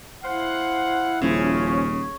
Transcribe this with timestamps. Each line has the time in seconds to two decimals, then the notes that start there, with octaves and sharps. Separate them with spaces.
0.24 E4 C5 F5 F#5
1.22 D#1 C#3 F3 C#4